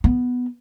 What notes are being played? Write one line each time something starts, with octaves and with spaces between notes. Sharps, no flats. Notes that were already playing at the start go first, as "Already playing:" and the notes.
B3